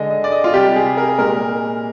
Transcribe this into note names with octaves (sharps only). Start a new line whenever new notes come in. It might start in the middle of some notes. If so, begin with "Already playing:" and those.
Already playing: D3 G#3 D#5
D#5
D5
D#5
F4
C3 G3 G4
G#4
A#4
A#2 G#3 A#4